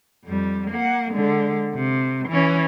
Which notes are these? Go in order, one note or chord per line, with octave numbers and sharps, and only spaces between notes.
F2 G3
A#3 F#5
D3 G#3
C3
E3 C#4